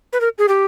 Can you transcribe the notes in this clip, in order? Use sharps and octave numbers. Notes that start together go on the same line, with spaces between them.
B4
A#4
G#4
G4